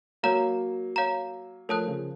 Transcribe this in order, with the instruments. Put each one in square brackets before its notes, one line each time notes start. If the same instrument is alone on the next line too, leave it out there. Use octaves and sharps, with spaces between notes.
[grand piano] F#3 A#3 [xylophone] C#5 F5 A#5
[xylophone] C#5 F5 A#5
[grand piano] F3 A3 [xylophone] A#4 C#5 A5 D#6 F#6
[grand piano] C#3 F3